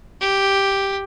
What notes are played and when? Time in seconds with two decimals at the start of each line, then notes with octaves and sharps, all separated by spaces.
0.21 G4